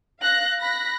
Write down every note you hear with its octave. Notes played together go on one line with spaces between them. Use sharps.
F5 F#6 A#6
B5 F#6 A#6